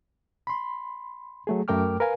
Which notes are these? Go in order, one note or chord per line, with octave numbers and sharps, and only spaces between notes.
B5 C6
F#3 A3 G#4
F#2 A3 A#4 G5 D6 F6
A#4 B4 F5 G#5